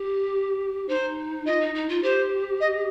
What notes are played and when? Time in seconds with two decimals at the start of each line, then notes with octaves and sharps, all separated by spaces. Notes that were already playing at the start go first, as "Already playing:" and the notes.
Already playing: G4
0.89 D#4 C5
1.46 F4 D#5
1.61 D#4
1.75 D#4
1.89 F4
2.03 G4 C5
2.61 D#5